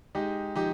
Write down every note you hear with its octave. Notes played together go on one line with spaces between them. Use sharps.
G#3 D#4 G4
F3 D#4 G4